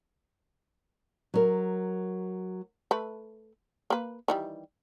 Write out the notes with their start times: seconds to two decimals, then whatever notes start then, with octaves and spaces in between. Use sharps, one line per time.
1.34 F#3 A#4
2.91 A3 B4
3.90 A#3 B4
4.28 D#3 E3 G3